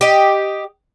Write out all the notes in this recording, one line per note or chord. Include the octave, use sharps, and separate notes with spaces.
G4 D#5